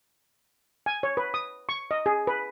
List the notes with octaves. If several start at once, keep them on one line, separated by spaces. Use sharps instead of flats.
G#5
C#5
B4
D#6
C#6
D#5
G#4
B4